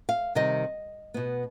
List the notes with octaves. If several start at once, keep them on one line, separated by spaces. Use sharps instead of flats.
F5
C3 D#3 G3 D#5
B2 B3